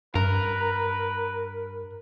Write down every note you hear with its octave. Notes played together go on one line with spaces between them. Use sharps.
G2 A#4 B4